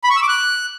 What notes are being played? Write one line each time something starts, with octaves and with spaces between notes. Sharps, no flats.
B5
C#6
E6
D6
F#6